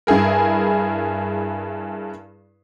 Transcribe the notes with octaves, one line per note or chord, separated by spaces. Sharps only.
G2 E4 G#4 A#4